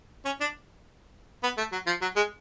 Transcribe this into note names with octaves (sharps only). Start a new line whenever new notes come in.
C#4
D4
B3
A3
F#3
F3
F#3
G#3